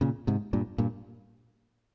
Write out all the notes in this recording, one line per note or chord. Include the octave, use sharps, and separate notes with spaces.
A#2 C#3
G#2 C3
G2 A#2
G2 A#2